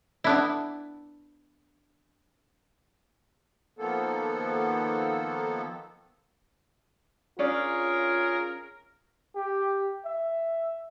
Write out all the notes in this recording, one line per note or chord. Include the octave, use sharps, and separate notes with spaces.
B3 D4 E4
D#3 F3 A#3 B3 A4
C#4 D4 F4 G#4 A#4 C#5 D5
G4
E5